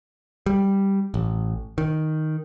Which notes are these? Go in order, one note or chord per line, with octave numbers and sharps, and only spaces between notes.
G3
A1
D#3